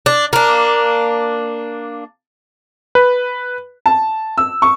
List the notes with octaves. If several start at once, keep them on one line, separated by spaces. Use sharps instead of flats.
D4
A#3 D4
B4
A5
E6
C#6